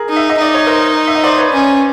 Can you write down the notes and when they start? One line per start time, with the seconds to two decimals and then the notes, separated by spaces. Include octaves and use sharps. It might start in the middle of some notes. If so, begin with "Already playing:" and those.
Already playing: G#4 A#4
0.09 D#4
0.16 E5
0.29 D#5
0.38 D#4 D5
0.54 C#5
0.67 A#4 C5
1.07 E5
1.15 D#5
1.23 C5 D5
1.38 B4 C#5
1.53 C#4